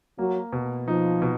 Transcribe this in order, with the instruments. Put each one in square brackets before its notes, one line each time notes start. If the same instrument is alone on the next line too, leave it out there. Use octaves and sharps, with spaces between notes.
[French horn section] F#3 [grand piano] A#3
[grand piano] B2
[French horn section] F3 [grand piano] D#4
[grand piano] B2